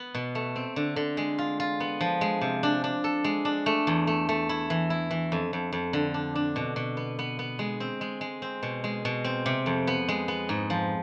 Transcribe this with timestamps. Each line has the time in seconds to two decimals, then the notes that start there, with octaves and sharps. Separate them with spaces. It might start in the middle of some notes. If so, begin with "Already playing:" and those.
Already playing: B3
0.14 B2
0.35 A3
0.56 C4
0.76 D3
0.96 D3
1.17 G#3
1.38 F4
1.60 F4
1.80 B3
2.01 F3
2.21 G#3
2.41 C3
2.63 D4
2.84 D4
3.04 A4
3.24 G#3
3.45 D4
3.66 A3
3.87 E2
4.07 A3
4.29 A3
4.49 E4
4.70 E3
4.90 E4
5.11 E3
5.32 F2
5.53 F2
5.72 F2
5.93 D3
6.14 D4
6.35 D4
6.56 B2
6.76 B2
6.97 B3
7.19 B3
7.39 B3
7.59 G#3
7.80 C4
8.01 G#3
8.21 G#3
8.42 C4
8.63 B2
8.84 G#3
9.05 B2
9.24 C4
9.46 C3
9.66 F2
9.87 B3
10.08 G#3
10.28 B3
10.49 G#2
10.70 F3